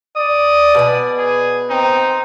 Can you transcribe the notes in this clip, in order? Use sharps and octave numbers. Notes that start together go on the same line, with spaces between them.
D5 D#6
B2 B4 G#5
G#4
C4 D#4